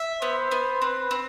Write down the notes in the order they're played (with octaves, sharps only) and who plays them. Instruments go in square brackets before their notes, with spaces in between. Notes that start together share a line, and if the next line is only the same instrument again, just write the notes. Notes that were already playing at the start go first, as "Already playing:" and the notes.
Already playing: [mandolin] E5
[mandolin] B3 [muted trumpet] C5
[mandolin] B3
[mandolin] C4 [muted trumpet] B4
[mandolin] C4